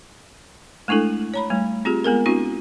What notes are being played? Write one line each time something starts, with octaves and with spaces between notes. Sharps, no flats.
G#3 A3 D4 E4 A4
C#5 A#5 B5
G3 A3
C4 F4 G4 G#4
G#3 B3 G#4 A#4
C4 D4 E4 F#4